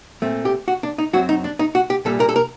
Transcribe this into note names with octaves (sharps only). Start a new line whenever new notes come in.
A#2 A3 C4
G4
F#4
D4
D#4
F#2 F#3 C4 F#4
D#4
D4
D#4
F#4
G4
C2 A#2 G3 A4
A#4
A4
A#4